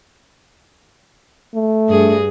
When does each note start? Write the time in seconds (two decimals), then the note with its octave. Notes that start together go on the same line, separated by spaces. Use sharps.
1.55 A3
1.89 G2 G#4